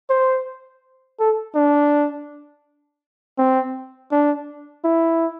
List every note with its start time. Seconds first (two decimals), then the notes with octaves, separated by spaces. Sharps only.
0.10 C5
1.20 A4
1.55 D4
3.38 C4
4.12 D4
4.84 E4